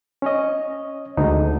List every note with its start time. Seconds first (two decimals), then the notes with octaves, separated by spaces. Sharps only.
0.22 C#4 C#5 D#5
1.17 D2 G#3 D#4